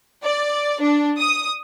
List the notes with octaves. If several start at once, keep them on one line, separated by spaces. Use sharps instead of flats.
D5
D4
D#6